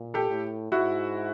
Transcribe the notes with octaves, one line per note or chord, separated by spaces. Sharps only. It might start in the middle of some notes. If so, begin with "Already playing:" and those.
Already playing: A#2
G4 A4
A2
G#2 E4 F#4